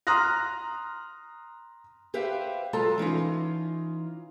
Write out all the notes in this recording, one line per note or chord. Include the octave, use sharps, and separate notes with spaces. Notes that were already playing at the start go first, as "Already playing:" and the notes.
A#5 C6 D#6 F6 F#6 A#6
G4 B4 C5 E5 F5 G5
F#3 G#3 F4 A4 A5 A#5
E3 C#4 D#4 F4